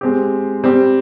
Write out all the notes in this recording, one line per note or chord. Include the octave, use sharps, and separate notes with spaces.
G#3 C4 G4
G3 C4 G4